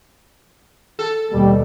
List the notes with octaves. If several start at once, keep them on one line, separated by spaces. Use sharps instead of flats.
A4
D#2 B2 G3